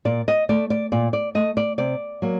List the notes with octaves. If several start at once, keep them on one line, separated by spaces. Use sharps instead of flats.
A#2 D5
D#5
A3 D5
D5
A#2 D5
D5
A3 D#5
D5
C3 D5
F#3 A#3